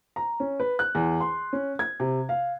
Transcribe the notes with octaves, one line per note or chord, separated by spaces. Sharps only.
A#5
C#4
B4
F#6
E2
C6
C#4
G#6
C3
F5